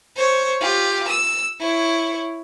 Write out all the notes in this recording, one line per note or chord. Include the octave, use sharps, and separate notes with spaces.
C5 C#5
F4 G4
E6
E4 C#5